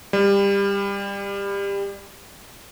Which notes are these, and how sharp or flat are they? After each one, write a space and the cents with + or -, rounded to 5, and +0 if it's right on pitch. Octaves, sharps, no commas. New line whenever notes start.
G3 +25